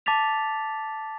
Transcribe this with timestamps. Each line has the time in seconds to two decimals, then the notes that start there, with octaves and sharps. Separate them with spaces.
0.06 A5 D6 A6 B6 F7